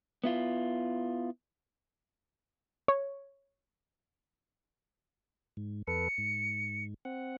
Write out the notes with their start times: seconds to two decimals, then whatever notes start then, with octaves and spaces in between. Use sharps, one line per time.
0.24 B3 E4 F4
2.88 C#5
5.57 G#2
5.87 F2 A4 B4 C#7
6.18 G#2
7.05 C4 F#5